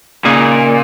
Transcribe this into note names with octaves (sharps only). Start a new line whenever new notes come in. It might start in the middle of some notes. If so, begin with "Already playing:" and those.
A#2 C#3 A#3 D#4 G#4